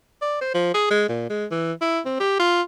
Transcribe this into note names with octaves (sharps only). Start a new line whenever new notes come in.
D5
C5
F3
G#4
G#3
A#2
G#3
E3
E4
C4
G4
F4